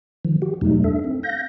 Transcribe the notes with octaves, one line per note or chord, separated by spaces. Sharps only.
D#3 F3
F#4 G4
E2 B2 F#3 G3 A3 D#4
D4 A4 E5
C4
F5 G6 A#6